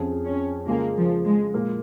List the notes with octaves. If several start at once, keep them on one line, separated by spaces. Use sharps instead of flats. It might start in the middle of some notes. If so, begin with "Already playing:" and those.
Already playing: F2 F3 C#4 G#4
C#4
C#3 G#3 A#3 F4 G#4
F3
G#3
A#2 A#3 F4 A#4